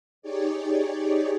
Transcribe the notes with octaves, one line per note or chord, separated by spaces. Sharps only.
D#4 G4 G#4 C#5 D5